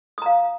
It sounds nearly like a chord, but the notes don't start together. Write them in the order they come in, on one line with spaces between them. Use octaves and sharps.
D#6 A#5 F5